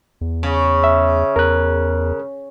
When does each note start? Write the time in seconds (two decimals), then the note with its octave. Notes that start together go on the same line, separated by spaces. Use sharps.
0.21 E2
0.43 C#3
0.84 E5
1.36 E2 A#4 F#6